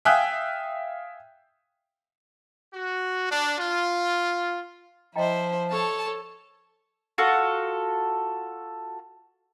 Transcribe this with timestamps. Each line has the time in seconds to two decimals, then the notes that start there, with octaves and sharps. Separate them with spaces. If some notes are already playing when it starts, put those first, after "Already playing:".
0.05 E5 F5 G5 G#5 D#6 F#6
2.72 F#4
3.29 D4
3.58 F4
5.16 F3 E4 C5 D#5 G5 A#5
5.71 A4 C#5 A5
7.18 F4 F#4 A4